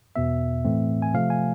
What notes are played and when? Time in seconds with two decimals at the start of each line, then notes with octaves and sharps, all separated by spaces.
0.16 E2 B2 B3 E5
0.65 A2 E3 A3 C4
1.02 G#5
1.14 C3 F3 A3 F5
1.30 G#5